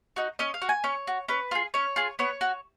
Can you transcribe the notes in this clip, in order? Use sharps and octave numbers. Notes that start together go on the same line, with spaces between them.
D#4 F#4
C#4 D#5
F5
F#4
G#5
C#4 C#5
F#4
C#4 B4
F4 G#4
C#4 C#5
F4 G#4
B3 C#5
F#4